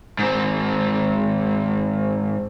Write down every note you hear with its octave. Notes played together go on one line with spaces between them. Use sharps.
G#2 C4